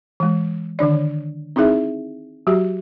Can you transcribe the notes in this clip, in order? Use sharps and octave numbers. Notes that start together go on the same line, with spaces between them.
E3 G#3
D3 D#3 D4 D5
C4 D#4 E4 G#4 E5
F#3 F#4 G4